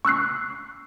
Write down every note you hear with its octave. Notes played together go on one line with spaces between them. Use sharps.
C#6 E6 F#6 C7